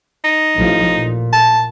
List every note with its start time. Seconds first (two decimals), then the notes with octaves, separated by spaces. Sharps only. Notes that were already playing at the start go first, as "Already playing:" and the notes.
0.24 D#4
0.56 A1 F3
0.94 A#2
1.33 A5